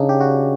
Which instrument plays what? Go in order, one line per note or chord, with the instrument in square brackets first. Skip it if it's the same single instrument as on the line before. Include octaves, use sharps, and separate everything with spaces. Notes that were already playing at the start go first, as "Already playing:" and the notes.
Already playing: [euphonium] C#3 [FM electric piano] D4 D#4
[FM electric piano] G4
F#4